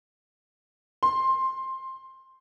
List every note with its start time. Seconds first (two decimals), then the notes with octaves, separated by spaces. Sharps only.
1.03 C6